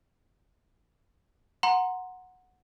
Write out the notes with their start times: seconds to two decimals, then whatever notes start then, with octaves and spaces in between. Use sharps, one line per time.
1.63 F#5 A#5 C6